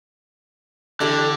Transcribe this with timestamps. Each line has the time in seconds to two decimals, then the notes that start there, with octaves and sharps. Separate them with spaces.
1.00 D3 E3 D4 G4 A4